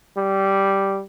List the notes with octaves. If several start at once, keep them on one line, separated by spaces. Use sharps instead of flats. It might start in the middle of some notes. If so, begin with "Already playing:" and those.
G3